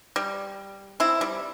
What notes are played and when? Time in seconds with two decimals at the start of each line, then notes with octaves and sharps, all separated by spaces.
0.16 G3
1.00 C4 E4
1.21 G3